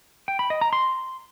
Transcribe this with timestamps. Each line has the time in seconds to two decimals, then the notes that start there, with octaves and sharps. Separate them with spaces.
0.28 G5
0.39 B5
0.50 D#5
0.61 A#5
0.73 C6